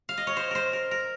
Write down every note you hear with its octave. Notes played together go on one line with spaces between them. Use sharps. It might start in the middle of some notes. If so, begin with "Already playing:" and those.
F5
D#5
C#5
C5
A#4 C5
A#4
A#4